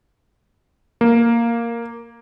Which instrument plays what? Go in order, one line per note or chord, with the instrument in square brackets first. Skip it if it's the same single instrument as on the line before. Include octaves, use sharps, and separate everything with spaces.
[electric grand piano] A#3